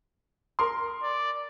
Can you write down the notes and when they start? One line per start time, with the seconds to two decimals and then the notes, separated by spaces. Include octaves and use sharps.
0.59 A#4 C6
1.03 D5